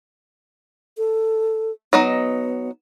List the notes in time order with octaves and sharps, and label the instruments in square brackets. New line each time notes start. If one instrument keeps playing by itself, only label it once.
[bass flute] A4
[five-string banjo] F#3 D#4 D#5 [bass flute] B3